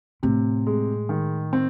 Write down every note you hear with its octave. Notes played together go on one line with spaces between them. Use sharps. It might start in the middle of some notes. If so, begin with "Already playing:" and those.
A2 C3
G#3
D#3
C4